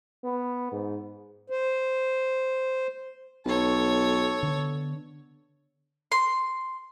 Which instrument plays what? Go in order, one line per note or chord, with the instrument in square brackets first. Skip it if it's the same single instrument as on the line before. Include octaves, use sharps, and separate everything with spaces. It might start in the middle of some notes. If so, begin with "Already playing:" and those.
[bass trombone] B3
G#2
[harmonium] C5
[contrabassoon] B1 [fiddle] A4 C#5
[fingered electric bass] D3 B3
[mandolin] C6